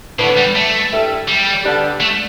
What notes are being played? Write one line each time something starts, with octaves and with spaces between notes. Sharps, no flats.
A2 D3 B3 D4 B4
G3
A3
G2 G3 E4 A4 E5
G3
D3 G3 B3 D4 G4
A3